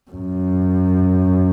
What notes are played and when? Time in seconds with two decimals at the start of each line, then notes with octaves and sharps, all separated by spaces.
0.11 F#2